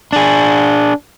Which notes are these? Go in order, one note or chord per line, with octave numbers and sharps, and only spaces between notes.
D4 G#4